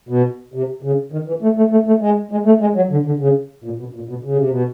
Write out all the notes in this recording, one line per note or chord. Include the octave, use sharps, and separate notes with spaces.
B2
C3
C#3
D#3
E3
A3
A3
A3
A3
G#3
G#3
A3
G#3
F#3
D3
D3
C#3
A#2
B2
A#2
B2
C#3
C3
B2